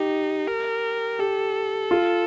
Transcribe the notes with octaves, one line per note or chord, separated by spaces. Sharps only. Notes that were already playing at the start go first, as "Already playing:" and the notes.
Already playing: D#4 G4
A#4
G4 A4
F4